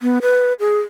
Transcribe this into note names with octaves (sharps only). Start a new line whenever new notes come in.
B3
B4
G#4